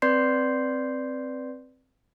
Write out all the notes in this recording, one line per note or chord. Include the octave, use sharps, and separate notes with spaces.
C4 B4 D5 C6 G6 C7